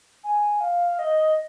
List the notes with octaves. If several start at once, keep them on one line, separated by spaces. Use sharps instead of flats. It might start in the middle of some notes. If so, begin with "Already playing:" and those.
G#5
F5
D#5